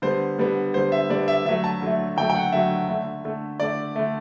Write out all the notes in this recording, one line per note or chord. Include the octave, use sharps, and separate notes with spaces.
D3 G3 B3 C5
D3 G3 B3
D3 G3 B3 C5
E5
D3 G3 B3 D5
E5
D3 F#3 A3 E5
A5
D3 F#3 A3
D3 F#3 A3 G5
G5
F#5
D3 F#3 A3 E5
D3 A3
D3 A3
D3 A3 D5
D3 A3